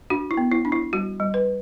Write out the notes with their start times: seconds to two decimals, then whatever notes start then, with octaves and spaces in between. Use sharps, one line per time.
0.10 D4 F#4
0.31 E4
0.37 B3
0.52 E4
0.65 D4
0.72 E4
0.93 G3 F#4
1.20 G3
1.34 B4